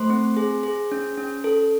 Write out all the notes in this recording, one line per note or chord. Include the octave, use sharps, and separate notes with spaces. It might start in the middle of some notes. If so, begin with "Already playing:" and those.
Already playing: A3 C5 C6
C4
G#4
G#4
C#4
C#4
A4